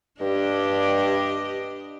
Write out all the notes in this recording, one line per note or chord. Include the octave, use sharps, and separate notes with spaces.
G2 D4 G4 D#5